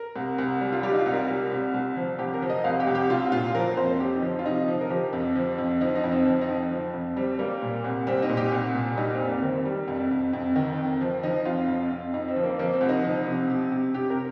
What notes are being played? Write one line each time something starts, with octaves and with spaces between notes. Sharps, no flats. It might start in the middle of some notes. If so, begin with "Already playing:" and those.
Already playing: A#4
C2
C2
G3
F4
G3 G4
D#4
F4
C2
A#4
G3
C2
C2
F3
C2 G4
A#4
F3
D#5
C2 F5
G4
C2
G4
C2 F4
A#2 F4
F3 A#4
F2 C5
F2 G4
D#4
F3
F4
C3 D#4
F3
A#4
F3 G4
F2
F3
F2
F3 D#4
D#4
F2
C4
F3
D#4
F2 C4
F3
F2
G3 C4
G3 A#3
A#2
C2
G3 C4
D#4
A#2
G4
C2
A#2
G3 D#4
C4
F2
A#3
D#3 C4
G3
F2
F2
F2
D#3
F2
F3
F3 D#4
F2 F4
F2
F2
F2 D#4
C4
F3
A#3
F3 A#3
C4
C2
D#4
F3
C3
C3
C3
C3 G4
A#4